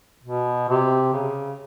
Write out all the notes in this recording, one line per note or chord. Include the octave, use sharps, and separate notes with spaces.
B2
C3
C#3